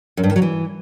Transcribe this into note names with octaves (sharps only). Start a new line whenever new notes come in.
F#2
G2
D#3
F#3
E3